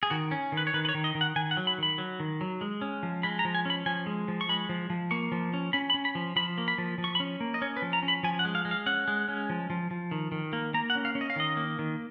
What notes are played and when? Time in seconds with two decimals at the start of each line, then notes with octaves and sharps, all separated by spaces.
0.03 G#4
0.10 D#3 F#4
0.31 C#4
0.52 D#3
0.57 B4
0.67 C#5
0.74 D#3 B4
0.85 B4
0.89 C#5
0.94 D#3
1.04 D#5
1.15 D#3
1.21 F#5
1.36 D#3 G#5
1.51 F#5
1.57 F#3
1.67 B5
1.78 D#3 B5
1.98 F#3
2.20 D#3
2.41 F#3
2.61 G#3
2.81 C#4
3.03 F3
3.23 G#3 B5
3.39 A#5
3.45 F3
3.55 G#5
3.65 C#4 B5
3.86 F3 G#5
4.06 G#3
4.28 F3
4.41 C#6
4.49 G#3 B5
4.69 F3
4.90 F3
5.11 A#3 C#6
5.32 F3
5.53 C#4
5.73 C#4 B5
5.90 B5
5.94 C#4
6.05 B5
6.15 F3
6.36 F3 B5
6.58 A#3
6.68 B5
6.78 F3
6.98 F3
7.04 C#6
7.15 B5
7.20 C#4
7.40 A#3
7.54 D#5
7.62 C#4 C#5
7.77 B4
7.82 F3
7.93 A#5
8.03 C#4
8.08 B5
8.23 F3 G#5
8.39 F#5
8.45 G#3
8.55 F5
8.65 G#3
8.71 F5
8.86 C#4 F#5
9.08 G#3
9.28 C#4
9.50 F3
9.70 F3
9.91 F3
10.11 D#3
10.32 D#3
10.53 A#3
10.74 A#3 A#5
10.90 F#5
10.95 C#4
11.05 F5
11.15 C#4
11.21 D#5
11.30 F5
11.36 D#3 D#5
11.57 A#3
11.79 D#3